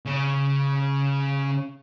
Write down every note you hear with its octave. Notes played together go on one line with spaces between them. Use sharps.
C#3 C#4